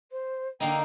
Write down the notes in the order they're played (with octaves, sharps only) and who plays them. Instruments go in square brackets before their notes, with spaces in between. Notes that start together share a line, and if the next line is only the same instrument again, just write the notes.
[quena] C5
[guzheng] D3 A#3 D#4 [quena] G5